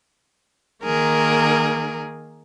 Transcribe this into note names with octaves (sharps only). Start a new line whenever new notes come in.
D#3 A#3 G#4 A#4